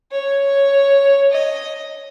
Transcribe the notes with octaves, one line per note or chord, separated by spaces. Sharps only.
C#5
D#5